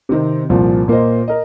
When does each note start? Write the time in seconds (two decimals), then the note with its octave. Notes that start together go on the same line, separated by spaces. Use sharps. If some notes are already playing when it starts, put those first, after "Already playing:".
0.09 C3 D#3 C4
0.49 C2 A#2 F3
0.88 A#2 A#3 F4 C5 D#5
1.28 A#4 D#5